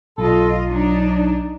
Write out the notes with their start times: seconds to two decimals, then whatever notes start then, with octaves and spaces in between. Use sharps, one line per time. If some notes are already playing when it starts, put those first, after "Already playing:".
0.18 B1 F4 A4 D#5
0.69 F#3 D4 D#4